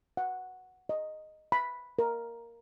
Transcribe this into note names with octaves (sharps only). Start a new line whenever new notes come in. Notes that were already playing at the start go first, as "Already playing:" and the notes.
F#5
D#5
B5
A#4